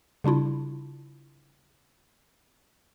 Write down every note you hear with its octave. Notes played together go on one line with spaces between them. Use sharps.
C#3 G3 D4 E4 F4